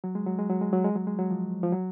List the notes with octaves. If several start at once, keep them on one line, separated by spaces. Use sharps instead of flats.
F#3
G#3
F#3
G#3
F#3
G#3
F#3
G#3
F#3
G#3
F#3
F3
F3
F#3